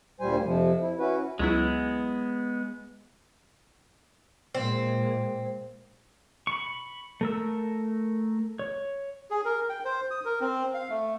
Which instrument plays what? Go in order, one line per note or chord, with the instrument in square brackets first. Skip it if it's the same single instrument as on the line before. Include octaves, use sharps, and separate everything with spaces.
[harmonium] D2 A#2 G3 C5 G#5
F2 C3 F3
E4
C#4 E4 F#4 B4
[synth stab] C#2 F#3 E4 [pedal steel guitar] G#3 B3
[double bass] A#2 G#3 [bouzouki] C4
[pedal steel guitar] B5 C#6
A3 A#4 E6
C#5
[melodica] G#4
A#4
G5
C5
D#6
A#4
C4
F5
A3